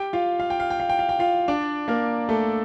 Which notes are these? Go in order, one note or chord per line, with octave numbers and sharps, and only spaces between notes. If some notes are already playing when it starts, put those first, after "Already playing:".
Already playing: G4 G5
F4 F5
F5
G5
F5
G5
F5
G5
F5
G5
F4 F5
D4 D5
A#3 A#4
A3 A4